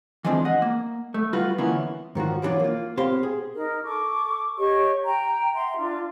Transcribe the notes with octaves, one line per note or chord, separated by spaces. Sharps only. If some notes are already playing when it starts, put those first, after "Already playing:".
E3 F3 G#3 C4 D4
D#5 F#5
A#3
A3
G3 F4 F#4 B4
D3 E3 A#3 B3 C#4 E4
G#2 D#3 F3 F#4
E3 F#3 G3 B3 D4 F4
A#3 F4
B2 C4 G4 C5 F5 C6
G#4
D#4 A#4
A4 C#6 D6
G4 C#5 D#5 C#6
G5 A#5
E5 F#5 A#5 C6
D4 F4